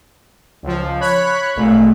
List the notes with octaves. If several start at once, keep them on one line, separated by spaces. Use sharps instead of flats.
C#2 F3
C#5 B5 F#6
G#1 A#2 A3